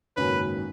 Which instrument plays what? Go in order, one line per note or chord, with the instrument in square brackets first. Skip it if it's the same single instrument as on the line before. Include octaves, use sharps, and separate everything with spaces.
[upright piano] G#1 F#2 C#3 F#3 A#3 [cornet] B4